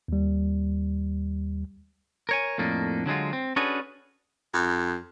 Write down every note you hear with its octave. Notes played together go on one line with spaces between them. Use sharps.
D#2 G3
A#4 C#5 G#5
F2 A2 A#3 D4 D#4
D3 F#3 G#3 F4
C4
C#4 D4 F#4 G#4 A4 B4
F2